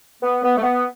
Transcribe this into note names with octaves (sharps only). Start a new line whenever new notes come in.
B3
B3
A3
B3